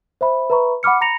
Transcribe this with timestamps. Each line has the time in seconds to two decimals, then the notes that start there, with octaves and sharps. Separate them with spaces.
0.21 C5 E5 B5
0.50 B4 E5 A#5 B5 C#6
0.83 F#5 B5 D6 F6 C#7
1.01 A#5 B5 A#6 C#7 F7